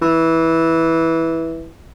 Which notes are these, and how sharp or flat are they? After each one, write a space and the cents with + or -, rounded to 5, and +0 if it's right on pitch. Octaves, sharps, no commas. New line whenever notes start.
E3 -10